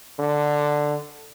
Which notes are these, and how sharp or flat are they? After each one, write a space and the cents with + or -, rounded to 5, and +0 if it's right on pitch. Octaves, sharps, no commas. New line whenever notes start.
D3 +5